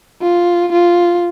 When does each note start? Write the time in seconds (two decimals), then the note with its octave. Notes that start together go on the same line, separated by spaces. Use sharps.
0.22 F4
0.72 F4